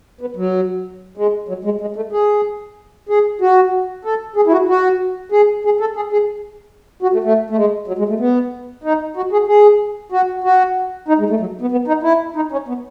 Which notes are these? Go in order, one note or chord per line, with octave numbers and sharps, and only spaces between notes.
B3
F#3
G#3
F#3
G#3
G#3
A3
G#4
G#4
F#4
A4
G#4
E4
F#4
F#4
G#4
G#4
A4
G#4
G#4
F#4
A3
A3
A3
G#3
F#3
G#3
A3
B3
D#4
F#4
G#4
G#4
F#4
F#4
D#4
G#3
A3
F#3
B3
B3
D#4
E4
D#4
C#4
B3